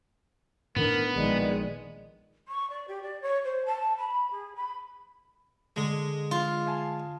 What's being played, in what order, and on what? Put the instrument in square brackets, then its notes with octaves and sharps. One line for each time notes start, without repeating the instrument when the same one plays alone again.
[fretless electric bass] A2 D#3 D4 [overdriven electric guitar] B3 [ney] A#4
[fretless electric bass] A#1 D#3 [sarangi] G#3 [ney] D5
[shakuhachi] C#6
D5
G4
D5
C#5
C5
A5
B5
G#4
B5
[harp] D3 [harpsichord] G#3
[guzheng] F4
[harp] F5 G#5 A5